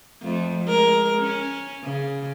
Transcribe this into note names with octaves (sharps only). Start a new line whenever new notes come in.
F2 A3
G#3 A#4
C#4
C#3